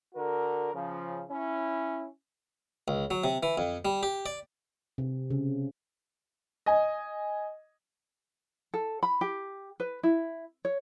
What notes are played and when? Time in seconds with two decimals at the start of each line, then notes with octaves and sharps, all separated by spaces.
0.15 D3 F#4 A#4
0.74 C#3 F3
1.29 C#4 E4
2.88 C#2
3.11 F#3
3.24 C3
3.43 E3
3.57 F2
3.85 G3
4.03 G4
4.26 D5
4.98 C3
5.31 C#3
6.66 D#5 G#5
8.74 A4
9.03 B5
9.21 G4
9.80 B4
10.03 E4
10.65 C#5